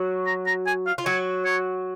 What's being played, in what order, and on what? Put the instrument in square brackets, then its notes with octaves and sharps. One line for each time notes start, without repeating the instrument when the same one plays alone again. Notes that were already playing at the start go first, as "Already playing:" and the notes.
Already playing: [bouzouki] F#3 F#4
[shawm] A#5
A#5
G#5
F5
[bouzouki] F4
[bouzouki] F#3 F#4 [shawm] C#5
[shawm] C#5